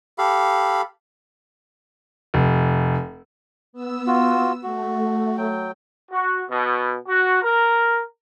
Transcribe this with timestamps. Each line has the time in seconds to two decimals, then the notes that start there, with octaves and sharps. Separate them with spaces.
0.18 G4 A4 F5 B5
2.34 F1
3.73 B3 E6
4.07 F4 F#4
4.63 A3 F#4
5.38 F#3 G5
6.12 F#4
6.51 B2
7.08 F#4
7.43 A#4